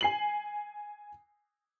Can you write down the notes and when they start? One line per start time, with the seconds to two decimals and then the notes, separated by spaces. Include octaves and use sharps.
0.01 G#5 C7 F#7